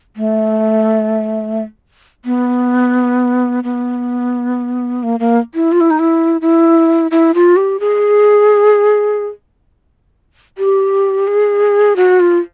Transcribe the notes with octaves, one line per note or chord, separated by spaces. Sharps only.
A3
B3
B3
A#3
A#3
E4
F4
E4
D#4
E4
E4
E4
F4
G4
G#4
G4
G#4
F#4
F4